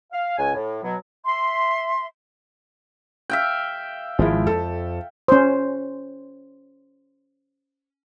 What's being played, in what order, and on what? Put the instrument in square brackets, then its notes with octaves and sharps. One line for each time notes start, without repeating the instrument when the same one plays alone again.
[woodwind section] F5
C#2 G#5
A2
B2 F#3
[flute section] E5 C6
[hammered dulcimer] E5 F5 G5
[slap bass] G#1 [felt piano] F3 G#3 E4
[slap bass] F2 [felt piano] A4
[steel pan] C#4 C5